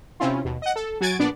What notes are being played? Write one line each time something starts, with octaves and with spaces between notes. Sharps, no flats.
C3 C4 C#4 E4 F4
D#2 B2
D#5 F#5
A4
F#3 F#4 G#5 G#6 A6 D7
A#1 B3 D4 D5